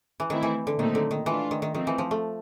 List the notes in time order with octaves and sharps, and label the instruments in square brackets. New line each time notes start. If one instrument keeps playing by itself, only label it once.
[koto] E3
[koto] D#3 [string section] A3 C4 E4
[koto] E3
D3
[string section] A#2 F#3 A3 C4 D#4 [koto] D#3
[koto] D3
D#3
[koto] E3 [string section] A3 D4 F4
[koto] D#3
D#3
[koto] D#3 [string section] F3 A3 C4
[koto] E3
F3
A3